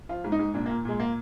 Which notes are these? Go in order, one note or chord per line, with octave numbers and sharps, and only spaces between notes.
F3 F4
G#2
D#4
G#2
A#2 D4
A#3
A#2
A#2 G#3
A#3